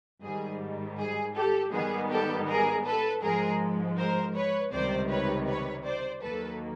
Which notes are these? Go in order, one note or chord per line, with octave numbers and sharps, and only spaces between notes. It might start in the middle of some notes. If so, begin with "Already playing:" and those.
G#2 D#3 G3 G#4
G#4
G4 A4
G#2 D#3 G3 B3 G#4
G4 A4
G#4 A#4
A4 B4
G#2 F3 G#3 G#4 A#4
A#4 C5
B4 C#5
C#2 C3 D#3 G3 C5 D5
B4 C#5
B4 C#5
C5 D5
D#2 D#3 F#3 A#3 A4 B4